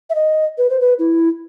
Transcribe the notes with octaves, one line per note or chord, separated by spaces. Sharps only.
E5
D#5
B4
C5
B4
E4